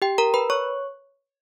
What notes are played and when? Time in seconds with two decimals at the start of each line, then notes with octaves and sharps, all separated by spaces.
0.02 G4 G5
0.18 A#4 A#5
0.34 B4 B5
0.50 C#5 C#6